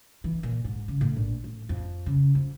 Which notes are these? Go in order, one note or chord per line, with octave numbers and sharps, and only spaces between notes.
E3
A#2
G#2
C#3
A2
A#1
A2
F2
C#3
F2